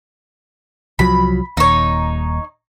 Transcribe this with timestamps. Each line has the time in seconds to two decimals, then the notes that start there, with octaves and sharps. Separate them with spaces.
0.99 C2 F3 F#3 B5
1.57 D#1 D#2 D#4 C#5